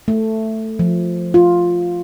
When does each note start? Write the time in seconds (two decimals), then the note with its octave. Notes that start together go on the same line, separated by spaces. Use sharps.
0.08 A3
0.79 F3
1.34 F4